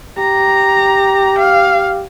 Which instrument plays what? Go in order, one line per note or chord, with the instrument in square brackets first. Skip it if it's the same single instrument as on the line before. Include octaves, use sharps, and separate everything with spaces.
[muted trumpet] G4 [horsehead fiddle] A#5
[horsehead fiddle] F5